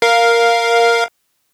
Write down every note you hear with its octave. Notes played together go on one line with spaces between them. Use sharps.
A#4 F5